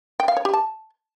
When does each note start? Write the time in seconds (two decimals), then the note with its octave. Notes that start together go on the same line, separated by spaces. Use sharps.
0.20 G5
0.28 F5
0.37 C#5
0.45 G4
0.54 A5